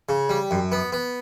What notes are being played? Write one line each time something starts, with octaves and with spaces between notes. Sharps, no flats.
C#3
G3
F#2
B3
B3